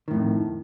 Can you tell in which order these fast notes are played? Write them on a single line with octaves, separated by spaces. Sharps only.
D#3 A2 F2